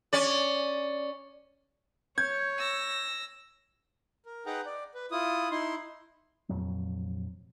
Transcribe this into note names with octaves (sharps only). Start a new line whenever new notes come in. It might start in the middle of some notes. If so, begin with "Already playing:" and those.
C#4 D5
C#5 G6 G#6
E6 A#6
A#4
D#4 G#4 B4 F#5 G5 A#5
D5
B4
E4 F4 D#6
D#4 E4 C6
F1 A#1 F2 F#3